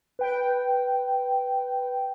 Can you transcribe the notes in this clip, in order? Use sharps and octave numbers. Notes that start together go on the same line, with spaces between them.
B4 G5